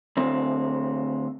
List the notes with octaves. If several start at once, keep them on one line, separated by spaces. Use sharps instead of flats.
D2 C4